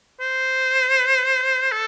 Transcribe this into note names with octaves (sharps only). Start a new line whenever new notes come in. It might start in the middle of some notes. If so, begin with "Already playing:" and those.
C5
A4